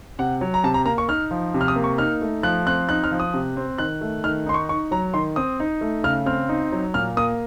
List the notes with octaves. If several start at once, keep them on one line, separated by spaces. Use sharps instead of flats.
C3 F#5
F#3
A#5
C3 A5
A#5
A#3 A#5
C#6
D#4 F6
F3
C3
F6
D#6
A#3
C#6
D#4 F6
A3
F3 F#6
C4 F#6
D#4 F#6
F6
F3
D#6
C3
C4
D#3 F#6
A3
D#3 F6
D#4 C6
C#6
D#4 C#6
F#3 A#5
D#3 C6
C4 D#6
D#4
A3
C#3 F6
C4 F6
D#4
F#3
A#2 F6
A#3 D#6